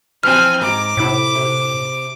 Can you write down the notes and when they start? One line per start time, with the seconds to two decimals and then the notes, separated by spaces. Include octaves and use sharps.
0.23 E3 F3 C4 G#5 F6
0.61 G#2 A#5 D6
0.97 A2 C3 E4
1.35 C3